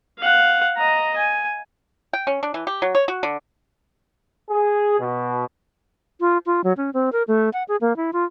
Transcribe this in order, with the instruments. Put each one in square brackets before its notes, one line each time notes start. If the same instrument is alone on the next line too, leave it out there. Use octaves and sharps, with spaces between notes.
[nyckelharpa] F5 F#5
D#5 A#5
G#5
[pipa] G5
C#4
D4
E3
G4
F#3
C#5
F#4
D3
[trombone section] G#4
B2
[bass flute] F4
F4
F#3
C#4
C4
A#4
A3
F#5
G#4
A#3
E4
F4